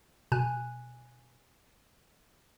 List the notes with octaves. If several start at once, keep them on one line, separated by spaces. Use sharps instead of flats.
B2 G#5 F#6